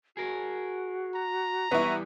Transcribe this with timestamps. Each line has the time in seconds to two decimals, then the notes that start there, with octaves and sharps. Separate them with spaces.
0.17 F#4 G#4 A#4
1.14 A#5
1.71 E3 G3 B3 E4 C#6